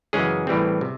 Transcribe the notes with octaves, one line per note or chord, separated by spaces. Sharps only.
F#2 C#3 E3 G#3 C#4 G#4
A2 E3 G3 C4
C3